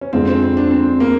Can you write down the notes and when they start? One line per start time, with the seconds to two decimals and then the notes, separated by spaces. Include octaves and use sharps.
0.01 C#4
0.13 F2 D3 F3 G#3 C4
0.28 C4
0.43 C4
0.57 D4
0.71 C4
1.00 A#3